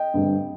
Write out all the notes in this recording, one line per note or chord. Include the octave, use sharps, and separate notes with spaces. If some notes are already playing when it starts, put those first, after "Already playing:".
Already playing: D#5 G5
G2 D3 G3 C4